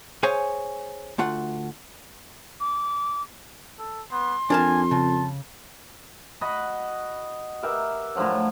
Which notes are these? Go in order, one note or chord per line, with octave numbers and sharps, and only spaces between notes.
G#4 C5 C#5 F5 G#5
D2 A3 F4 F#5
D6
A4
B3 C6
F2 D4 A#4 G#5 A5
C#3 A5
F#4 D#5 B5
G4 A#4 B4 E5
A2 D3 F3 F#3